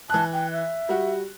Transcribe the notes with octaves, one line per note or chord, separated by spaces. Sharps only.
E3 A5 F#6
G5
E5
G3 F#4